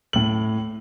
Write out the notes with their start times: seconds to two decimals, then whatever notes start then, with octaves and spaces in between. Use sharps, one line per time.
0.13 A2 F#7